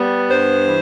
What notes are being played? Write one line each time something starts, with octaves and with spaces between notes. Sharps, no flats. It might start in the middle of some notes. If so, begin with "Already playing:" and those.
Already playing: G3 B3
G2 C5
E3